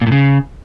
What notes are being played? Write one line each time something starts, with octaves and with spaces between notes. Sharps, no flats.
A#2
A2
C#3